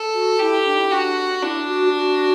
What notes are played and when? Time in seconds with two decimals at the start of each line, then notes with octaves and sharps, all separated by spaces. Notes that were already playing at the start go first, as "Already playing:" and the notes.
Already playing: A4
0.15 F#4
0.39 E4 G4
0.66 D4
0.78 E4
0.90 D4 F#4
1.42 D4 E4
1.67 F#4
1.94 F#4